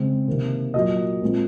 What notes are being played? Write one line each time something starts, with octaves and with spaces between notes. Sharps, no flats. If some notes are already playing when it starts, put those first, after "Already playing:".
Already playing: C#3 G#3 C4
C3 D#3 A#3
A#2 F#3 A#3 D#5
A#2 G#3 C4